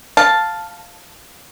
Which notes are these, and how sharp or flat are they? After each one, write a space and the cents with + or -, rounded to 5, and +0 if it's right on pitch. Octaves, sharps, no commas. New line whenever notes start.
F5 +0 A5 +0